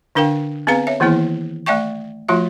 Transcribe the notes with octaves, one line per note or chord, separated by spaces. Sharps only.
D3 D4 A#4 F5 G5
B3 C4 G#4 B4 F5 A#5
C#5 E5
D#3 E3 A#3 B3 E4 G#4
A3 D5 E5 G5 C#6
F3 A3 F4 F#4 E5